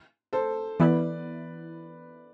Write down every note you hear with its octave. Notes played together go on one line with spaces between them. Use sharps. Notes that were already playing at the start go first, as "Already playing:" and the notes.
A4 C5
E3 B3 E4 B4 D5